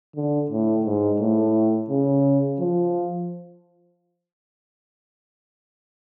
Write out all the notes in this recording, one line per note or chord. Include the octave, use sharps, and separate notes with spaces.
D3
A2
G#2
A2
C#3
F3